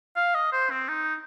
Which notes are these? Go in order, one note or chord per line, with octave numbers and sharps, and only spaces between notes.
F5
D#5
C5
C4
D#4